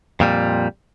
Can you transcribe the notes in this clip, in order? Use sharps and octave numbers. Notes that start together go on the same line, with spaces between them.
F2 A#2 G3